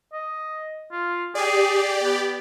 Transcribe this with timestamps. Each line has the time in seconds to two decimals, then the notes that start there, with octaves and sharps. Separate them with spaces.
0.13 D#5
0.92 F4
1.35 G4 G#4 D5
2.03 B3